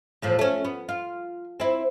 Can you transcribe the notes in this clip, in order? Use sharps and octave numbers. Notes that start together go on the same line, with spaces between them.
E2 A2 F3
A3 C#4
B3
F4
C4 E4